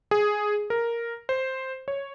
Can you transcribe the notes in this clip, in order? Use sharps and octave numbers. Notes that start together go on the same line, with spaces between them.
G#4
A#4
C5
C#5